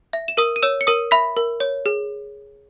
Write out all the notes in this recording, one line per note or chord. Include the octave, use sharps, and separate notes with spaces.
E5
E7
A#4 D#6 D#7
D#7
C#5 E6 E7
C#7
A#4 D#6 D#7
E5 B5 B6
A#4
C#5
G#4